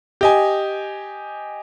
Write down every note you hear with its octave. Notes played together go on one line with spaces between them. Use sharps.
G4 D#5 G#5